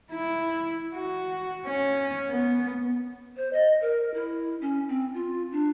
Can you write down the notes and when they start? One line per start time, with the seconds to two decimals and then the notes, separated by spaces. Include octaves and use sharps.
0.12 E4
0.95 F#4
1.66 C#4
2.29 B3
3.37 C5
3.53 D#5
3.81 A#4
4.14 E4
4.61 C#4
4.89 C4
5.14 F4
5.52 D4